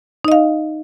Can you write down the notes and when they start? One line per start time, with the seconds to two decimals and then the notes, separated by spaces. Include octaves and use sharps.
0.25 D#4
0.28 D#5
0.32 F5